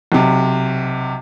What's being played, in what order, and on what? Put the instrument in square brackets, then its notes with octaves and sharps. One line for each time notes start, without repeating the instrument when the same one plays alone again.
[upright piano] B1 C3